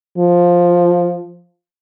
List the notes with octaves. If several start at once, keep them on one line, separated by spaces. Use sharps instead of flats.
F3